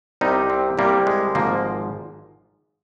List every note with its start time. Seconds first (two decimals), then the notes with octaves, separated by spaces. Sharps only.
0.21 C2 C3 G3 D#4
0.50 C4
0.78 C2 C3 G3 A#3
1.07 G#3
1.35 G#1 G#2 F3 A#3